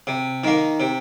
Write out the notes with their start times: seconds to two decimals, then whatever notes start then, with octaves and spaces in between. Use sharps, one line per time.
0.07 C3
0.44 D#3 A#3
0.80 C3